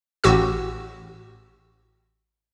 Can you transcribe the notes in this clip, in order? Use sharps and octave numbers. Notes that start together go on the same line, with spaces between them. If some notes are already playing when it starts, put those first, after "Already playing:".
A1 A2 F#4 G4 E6